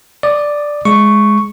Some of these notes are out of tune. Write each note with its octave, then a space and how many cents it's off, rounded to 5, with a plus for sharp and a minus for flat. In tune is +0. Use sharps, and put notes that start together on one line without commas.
D5 +0 D#6 -30
G#3 +5 C#6 +0